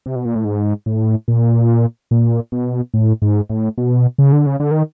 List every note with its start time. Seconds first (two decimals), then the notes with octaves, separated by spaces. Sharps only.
0.06 C3
0.16 B2
0.25 A#2
0.35 A2
0.45 G#2
0.86 A2
1.28 A#2
2.11 A#2
2.52 B2
2.94 A2
3.22 G#2
3.50 A2
3.78 B2
4.18 C#3
4.32 D3
4.46 C#3
4.60 D3
4.71 D#3